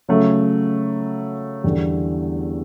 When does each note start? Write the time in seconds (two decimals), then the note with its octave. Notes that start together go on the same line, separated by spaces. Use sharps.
0.08 C#3 F#3 A3
1.64 E2 D3 G3